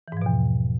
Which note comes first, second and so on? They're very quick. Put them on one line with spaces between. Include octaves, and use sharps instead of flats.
E3 G#2 F3 B2 E2